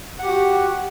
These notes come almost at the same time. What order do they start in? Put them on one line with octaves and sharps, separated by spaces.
F#5 G4 F#4